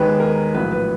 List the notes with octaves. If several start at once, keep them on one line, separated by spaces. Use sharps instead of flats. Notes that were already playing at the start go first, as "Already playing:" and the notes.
Already playing: D#2 D#3 G#3 B3 B4
A#4
A#1 A2 F#3 B3 B4
B4